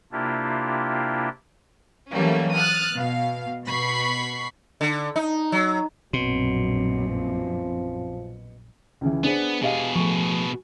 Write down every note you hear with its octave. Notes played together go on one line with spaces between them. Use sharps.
C3 A#3 D4 E4 F4 G4
E3 F#3 G3 A3 A#3 C#4
D#6 F6 F#6 A6
B2 F5
B2 B5 C#6 C7
D3
D#4
F#3
A#1 F#2 B2 F#3 C4
F3
C#2 C#3 E3
B3 D4 G#4 C5
B2 G4 G#4 D#5 F5
A2 F3 C#6